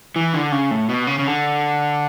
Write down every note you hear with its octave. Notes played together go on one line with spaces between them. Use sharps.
E3
D3
C#3
A2
B2
C#3
C#3
D3